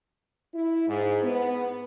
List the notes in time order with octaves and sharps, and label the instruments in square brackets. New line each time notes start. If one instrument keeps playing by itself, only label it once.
[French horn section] E4
G#2
B3